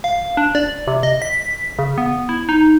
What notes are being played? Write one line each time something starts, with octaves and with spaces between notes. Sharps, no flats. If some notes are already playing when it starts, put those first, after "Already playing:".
F5
D4
D5
C3
D#5
B6
C#3
B3
E4
D#4